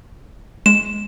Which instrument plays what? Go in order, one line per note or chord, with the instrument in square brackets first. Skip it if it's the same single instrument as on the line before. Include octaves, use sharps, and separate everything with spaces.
[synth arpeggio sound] G#3 [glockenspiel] E7